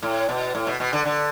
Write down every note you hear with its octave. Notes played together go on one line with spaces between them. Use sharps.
A2
B2
A2
B2
B2
D3
D3